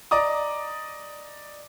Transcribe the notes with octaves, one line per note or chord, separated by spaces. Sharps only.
D5 D#5 A#5 D6 D#6